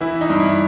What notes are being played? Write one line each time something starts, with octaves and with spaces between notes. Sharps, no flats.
E3 E4
D#4
G2
E4